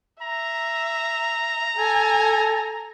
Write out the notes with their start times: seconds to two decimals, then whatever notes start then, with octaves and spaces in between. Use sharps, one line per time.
0.22 E5 A#5
1.76 A4 G#5